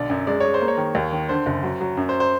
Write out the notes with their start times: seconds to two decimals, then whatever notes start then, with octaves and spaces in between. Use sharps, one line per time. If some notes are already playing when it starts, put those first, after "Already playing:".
Already playing: B1 D3 D5
0.10 F#2
0.27 G#3 D5
0.40 G#3 C#5
0.54 C5
0.61 A#3
0.68 C#5
0.78 D#3
0.95 D#2
1.12 D#3
1.29 D3 C5
1.46 F#1
1.63 F#3
1.80 F#3
1.97 F#2
2.09 C5
2.20 C5